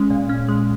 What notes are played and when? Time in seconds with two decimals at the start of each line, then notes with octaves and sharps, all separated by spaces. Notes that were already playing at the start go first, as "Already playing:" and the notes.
Already playing: G#3 C#4
0.10 A#2
0.29 C#4
0.49 G#3